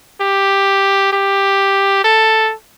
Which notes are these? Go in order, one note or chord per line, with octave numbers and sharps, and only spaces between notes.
G4
G4
A4